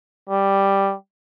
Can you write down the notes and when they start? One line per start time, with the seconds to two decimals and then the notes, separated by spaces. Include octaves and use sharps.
0.29 G3